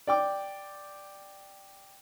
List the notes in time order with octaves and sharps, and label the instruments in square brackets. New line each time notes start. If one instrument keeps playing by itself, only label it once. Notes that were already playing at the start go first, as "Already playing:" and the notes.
[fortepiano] D5 G5 D6